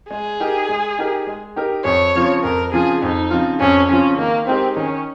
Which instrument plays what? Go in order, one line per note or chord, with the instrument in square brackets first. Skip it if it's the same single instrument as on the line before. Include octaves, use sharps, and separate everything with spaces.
[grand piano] G#3 [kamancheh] G#4
[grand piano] D#4 G4 A#4
G#3
D#4 G4 A#4
G#3
D#4 G4 A#4
[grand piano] F2 [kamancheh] C#5
[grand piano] C#3 F3 C4 F4
[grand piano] F2 [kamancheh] A#4
[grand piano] C#3 F3 C4 F4 [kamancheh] G#4
[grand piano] F2 [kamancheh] D#4
[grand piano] C#3 F3 C4 F4
[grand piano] F2 [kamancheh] C#4
[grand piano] C#3 F3 C4 F4 [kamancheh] C#4
[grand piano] D#3 [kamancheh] A#3
[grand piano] G#3 D#4 G4 A#4 [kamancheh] C4
[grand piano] D#3 [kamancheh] C#4